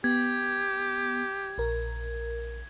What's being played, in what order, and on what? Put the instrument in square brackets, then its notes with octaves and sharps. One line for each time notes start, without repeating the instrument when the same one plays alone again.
[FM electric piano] B3 [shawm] G4 [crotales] G#6
[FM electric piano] A#1 A#4